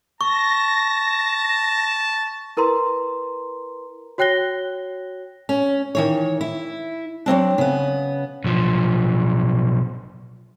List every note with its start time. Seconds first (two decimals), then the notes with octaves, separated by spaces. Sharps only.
0.21 A5 C#6 A#6
2.57 E4 A#4 B4 A#5 C6
4.18 F#4 C#5 G5 F#6 A#6 G7
5.49 C#4
5.95 D#3 E3 C#5
6.41 E4
7.26 F#3 A#3 C4 D4
7.58 C#3 B3
8.44 B1 F3